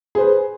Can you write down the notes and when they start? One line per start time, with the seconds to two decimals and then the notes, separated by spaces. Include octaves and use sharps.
0.15 G#4
0.18 C5
0.20 B4